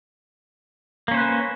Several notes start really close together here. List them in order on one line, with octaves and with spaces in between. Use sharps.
A#3 C#4 C5 B4